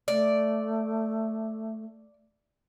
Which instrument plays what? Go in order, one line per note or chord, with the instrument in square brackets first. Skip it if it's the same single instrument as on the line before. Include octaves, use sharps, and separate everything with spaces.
[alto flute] A3 [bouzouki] D5